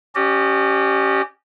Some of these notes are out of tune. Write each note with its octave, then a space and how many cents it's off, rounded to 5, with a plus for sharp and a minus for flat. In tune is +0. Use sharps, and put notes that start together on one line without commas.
C#4 +0 G4 -20 D#5 -40